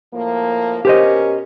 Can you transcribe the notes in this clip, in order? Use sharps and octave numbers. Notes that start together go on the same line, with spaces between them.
A2 F3 A#3
B2 C#4 G4 A#4 C5 D#5